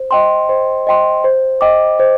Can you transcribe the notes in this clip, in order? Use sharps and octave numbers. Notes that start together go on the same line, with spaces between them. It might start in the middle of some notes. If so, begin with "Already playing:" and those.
Already playing: C5
D#5 G5 C6
C5
D#5 G5 C6
C5
D#5 G5 D6
C5